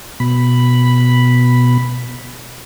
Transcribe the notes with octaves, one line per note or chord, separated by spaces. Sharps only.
B2 B5